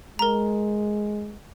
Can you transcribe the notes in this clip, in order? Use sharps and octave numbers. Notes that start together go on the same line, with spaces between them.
G#3 A#4 A#5